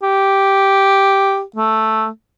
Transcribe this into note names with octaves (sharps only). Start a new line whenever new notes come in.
G4
A3